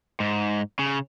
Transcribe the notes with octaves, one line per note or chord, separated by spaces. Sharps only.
G#2
C#3